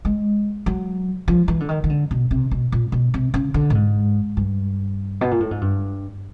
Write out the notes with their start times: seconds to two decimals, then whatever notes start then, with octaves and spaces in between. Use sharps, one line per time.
0.05 G#3
0.66 F#3
1.28 F3
1.48 E3
1.60 D3
1.69 D#3
1.84 D#3
1.90 D3
2.11 B2
2.31 C3
2.51 B2
2.72 A#2
2.92 B2
3.14 C3
3.34 C#3
3.54 D3
3.70 A2
3.75 G#2
4.37 G2
5.21 B2
5.31 A#2
5.40 A2
5.51 G#2
5.61 G2